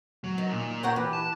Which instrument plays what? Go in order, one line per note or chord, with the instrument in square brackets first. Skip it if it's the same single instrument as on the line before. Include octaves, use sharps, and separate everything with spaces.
[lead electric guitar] F#3
[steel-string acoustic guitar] D#3
[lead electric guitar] A#2
[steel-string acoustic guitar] A#4 F#5 G5 [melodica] C#5 A#5
[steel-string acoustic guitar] E3 [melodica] G4 B4
[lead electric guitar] A5